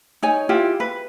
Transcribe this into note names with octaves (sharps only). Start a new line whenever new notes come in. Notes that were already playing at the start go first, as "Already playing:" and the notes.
D#4 C#5 G#5
E4 F4 G4
B4